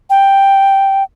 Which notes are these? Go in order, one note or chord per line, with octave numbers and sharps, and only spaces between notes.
G5